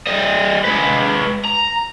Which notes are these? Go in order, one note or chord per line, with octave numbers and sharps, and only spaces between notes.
G3 D#5
G#3 B4
A#5